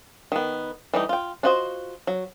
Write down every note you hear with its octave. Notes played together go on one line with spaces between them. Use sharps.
D#3 B3
E3 G3 A3 D#4
F4 G5
D4 F4 F#4 C5 D#5
F#3